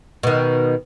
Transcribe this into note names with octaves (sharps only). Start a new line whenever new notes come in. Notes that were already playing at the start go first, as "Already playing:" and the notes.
B2 D#3